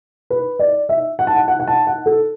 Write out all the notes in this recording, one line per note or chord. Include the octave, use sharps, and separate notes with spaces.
B4
D5
E5
F#5
A5
F#5
F#5
F#5
A5
F#5
A4